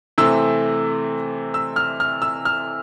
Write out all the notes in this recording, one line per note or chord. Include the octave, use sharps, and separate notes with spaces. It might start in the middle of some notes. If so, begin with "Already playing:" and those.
C3 E3 A3 C4 E6
E6
F6
F6
E6
F6